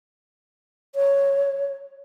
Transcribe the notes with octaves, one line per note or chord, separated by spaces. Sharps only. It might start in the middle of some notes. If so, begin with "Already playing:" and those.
C#5